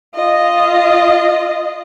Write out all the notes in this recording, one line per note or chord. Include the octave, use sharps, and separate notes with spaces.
F4 D#5